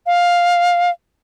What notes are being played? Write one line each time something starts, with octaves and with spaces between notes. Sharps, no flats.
F5